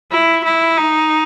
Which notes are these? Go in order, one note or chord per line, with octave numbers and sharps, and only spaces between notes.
E4
E4
D#4